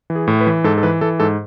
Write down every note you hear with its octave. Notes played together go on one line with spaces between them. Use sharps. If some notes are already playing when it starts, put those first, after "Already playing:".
E3
G#4
A2
B4
E3
G#2 A4
A4
E3 B4
E3 A4
G#2 A4